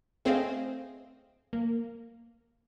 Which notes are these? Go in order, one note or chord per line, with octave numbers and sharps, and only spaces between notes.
A3 C4 G#4 C5 D#5 F5
A#3